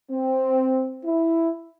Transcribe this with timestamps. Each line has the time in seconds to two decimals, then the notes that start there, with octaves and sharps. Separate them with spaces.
0.11 C4
1.04 E4